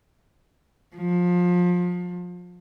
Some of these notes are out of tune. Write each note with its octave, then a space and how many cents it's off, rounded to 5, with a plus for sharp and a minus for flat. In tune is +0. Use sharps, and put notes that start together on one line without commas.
F3 +25